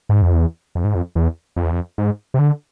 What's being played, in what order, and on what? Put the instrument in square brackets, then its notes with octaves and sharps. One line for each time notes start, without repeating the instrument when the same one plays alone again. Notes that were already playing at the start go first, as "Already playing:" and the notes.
[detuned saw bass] G#2
F2
E2
F2
G#2
F2
E2
F2
E2
F2
G#2
C3
D3